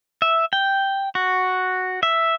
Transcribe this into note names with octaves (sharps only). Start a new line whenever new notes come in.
E5
G5
F#4
E5